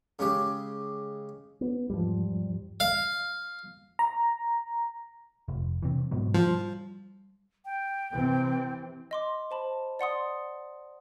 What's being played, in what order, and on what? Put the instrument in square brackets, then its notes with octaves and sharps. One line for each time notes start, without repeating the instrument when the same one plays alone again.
[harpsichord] C#3 G#3 G4
[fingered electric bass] B3
[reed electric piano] E2 G#2 F3 [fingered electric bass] G3
[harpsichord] F5
[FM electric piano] A#5
[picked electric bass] F1
C3 E3
G#2 B2 F#3
[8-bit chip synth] F3 [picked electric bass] G3
[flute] G5
[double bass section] C3 E3 C4
[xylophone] D#5 C6 D6
C5 A5 B5
D5 F#5 C6 D#6